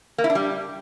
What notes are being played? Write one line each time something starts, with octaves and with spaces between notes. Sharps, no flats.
A#3
E4
D4
G3